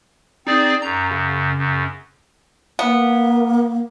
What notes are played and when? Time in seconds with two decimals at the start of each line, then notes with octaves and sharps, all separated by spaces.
0.47 C4 D#4 G#4 D5
0.82 F#2 A#5
1.11 C#3
1.57 F#2
2.79 A#3 B3